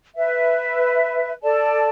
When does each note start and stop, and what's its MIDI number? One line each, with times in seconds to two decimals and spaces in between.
0.16 1.32 71
0.16 1.32 76
1.43 1.89 69
1.43 1.89 74
1.43 1.89 81